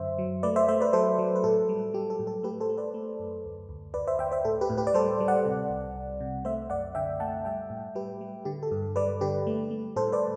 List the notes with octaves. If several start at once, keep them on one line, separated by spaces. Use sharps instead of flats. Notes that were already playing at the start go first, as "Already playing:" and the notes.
Already playing: F#2 D3 C5 E5
F#3
A3 B4 D5
C5 E5
A3 C5 E5
B4 D5
F#3 A4 C5
F#3
B4
A2 A4
G3
G3 G4
A4
A2
A4
A3 G4 B4
A4 C5
A3
B4 D5
A3
F#2
D2
D2
D2 B4 D5
C5 E5
D2 E5 G5
C5 E5
A2 A4
G4 B4
A2
G4 B4
D5
G3 A4 C5
G3
D5 F#5
C3
C2
C2
C3
A3 C5 E5
F#2 D5 F#5
D3 E5 G5
A3 F#5 A5
G3 E5 G5
A2
G3 G4 B4
G3
D3 G4
A4
G2
G3 B4 D5
D3 G4 B4
A3
A3
A2 A4 C5
B4 D5